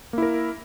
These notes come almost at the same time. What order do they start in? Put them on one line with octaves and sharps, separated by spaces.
A#3 E4 A#4